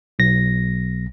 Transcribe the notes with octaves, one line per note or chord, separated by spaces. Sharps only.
B1 A#6